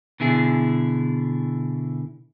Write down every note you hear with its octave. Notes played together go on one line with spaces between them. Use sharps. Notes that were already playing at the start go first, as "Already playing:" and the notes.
B2 D3 E4 G#4